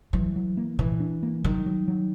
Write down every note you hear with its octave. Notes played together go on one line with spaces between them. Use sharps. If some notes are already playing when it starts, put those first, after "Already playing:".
E3 F#3
F#3
A#3
A#2 E3
D4
A#3
D#3 F#3
F#3
F#3